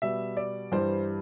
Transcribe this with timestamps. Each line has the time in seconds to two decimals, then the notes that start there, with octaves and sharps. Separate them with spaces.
0.02 B2 G3 E5
0.37 D5
0.72 G2 E3 G3 C5